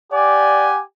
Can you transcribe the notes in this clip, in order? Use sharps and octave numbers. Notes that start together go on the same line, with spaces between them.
G4 D5 F#5 G#5